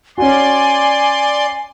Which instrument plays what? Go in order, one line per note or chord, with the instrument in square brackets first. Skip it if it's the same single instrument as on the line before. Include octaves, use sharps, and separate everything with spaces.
[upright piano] C#4 F#4 [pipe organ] D5 C6 [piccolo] G#5